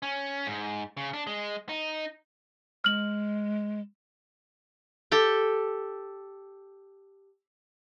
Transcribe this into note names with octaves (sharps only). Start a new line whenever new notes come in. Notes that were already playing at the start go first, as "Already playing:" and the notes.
C#4
G#2
C#3
D4
G#3
D#4
G#3 F6 F#7
G4 A4 G5